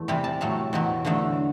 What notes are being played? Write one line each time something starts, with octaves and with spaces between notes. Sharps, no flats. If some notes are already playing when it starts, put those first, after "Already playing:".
Already playing: E2 A3
C3 E3 G3 C4 A5
A5
A2 F#3 A3 A5
E2 B2 F#3
E2 D3 F#3 A3